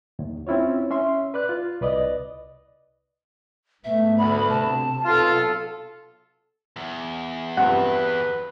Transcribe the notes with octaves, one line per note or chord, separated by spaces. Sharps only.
D#2
C4 C#4 E4 F4 C#5
C#4 E5 C6
B4 D5 F#6
F4
C2 B4 D5 D#5
G#2 A3 B3 E5
D2 B5
C3 A5
B1 F4 A4
E2
G2 C3 F3 B4 F#5